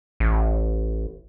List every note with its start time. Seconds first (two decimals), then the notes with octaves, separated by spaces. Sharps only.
0.20 A1